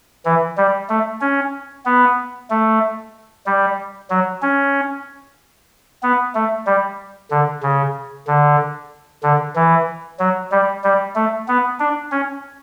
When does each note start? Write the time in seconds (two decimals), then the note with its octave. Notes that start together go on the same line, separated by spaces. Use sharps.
0.25 E3
0.57 G3
0.90 A3
1.21 C#4
1.86 B3
2.50 A3
3.46 G3
4.10 F#3
4.42 C#4
6.03 B3
6.35 A3
6.67 G3
7.31 D3
7.63 C#3
8.27 D3
9.23 D3
9.56 E3
10.19 F#3
10.52 G3
10.84 G3
11.16 A3
11.48 B3
11.80 D4
12.12 C#4